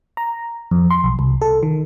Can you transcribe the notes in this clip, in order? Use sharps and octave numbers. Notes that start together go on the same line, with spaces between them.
A#5
F2
C6
B1
C2
A4
D#3